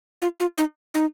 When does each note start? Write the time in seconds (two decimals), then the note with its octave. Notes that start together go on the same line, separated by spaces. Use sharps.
0.22 F4
0.40 F4
0.58 D#4
0.94 D#4